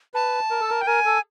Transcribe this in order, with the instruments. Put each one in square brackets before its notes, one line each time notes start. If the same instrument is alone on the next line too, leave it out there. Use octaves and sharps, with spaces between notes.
[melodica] B4 [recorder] A5
[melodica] A#4
A4
A#4
[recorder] G5
[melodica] A#4 [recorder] G#5
[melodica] A4